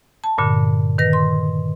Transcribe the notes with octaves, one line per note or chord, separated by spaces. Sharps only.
A5
G2 A#2 D3
D#3 B4 A#6
C6